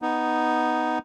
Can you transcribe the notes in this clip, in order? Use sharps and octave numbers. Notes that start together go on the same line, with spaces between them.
B3 D#4